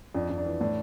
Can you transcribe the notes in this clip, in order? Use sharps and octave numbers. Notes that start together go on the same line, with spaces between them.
F2 D4
F2
D4
E3
A2 D4